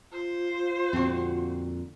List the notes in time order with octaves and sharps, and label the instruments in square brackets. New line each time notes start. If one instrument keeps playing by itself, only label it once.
[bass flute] F4 [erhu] C5
[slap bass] F2 A#2 D3 [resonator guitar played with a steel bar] C4 F#4